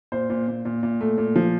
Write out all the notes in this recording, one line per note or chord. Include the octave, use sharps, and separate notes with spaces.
A#2 C5
A#2
A#2
A#2
A#2
A3
A#2
F3